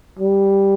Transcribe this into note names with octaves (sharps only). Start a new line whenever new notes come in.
G3